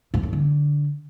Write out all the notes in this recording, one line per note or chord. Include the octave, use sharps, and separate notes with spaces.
G#2
F#2
D3